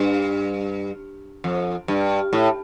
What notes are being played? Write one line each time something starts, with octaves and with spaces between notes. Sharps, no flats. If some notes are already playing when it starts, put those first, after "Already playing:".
Already playing: G2
F2
G2
A2